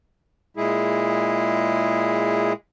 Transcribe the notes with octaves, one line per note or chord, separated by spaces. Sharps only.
A#2 G#3 E4 G#4